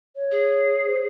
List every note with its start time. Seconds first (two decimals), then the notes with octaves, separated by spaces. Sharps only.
0.16 C#5
0.31 G#4
0.86 C5